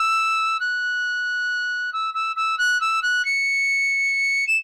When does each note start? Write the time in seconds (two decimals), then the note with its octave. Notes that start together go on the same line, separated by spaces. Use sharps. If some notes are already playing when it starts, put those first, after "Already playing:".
Already playing: E6
0.60 F#6
1.93 E6
2.14 E6
2.36 E6
2.58 F#6
2.80 E6
3.02 F#6
3.25 C#7
4.47 E7